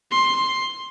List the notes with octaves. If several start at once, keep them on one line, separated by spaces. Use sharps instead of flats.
C6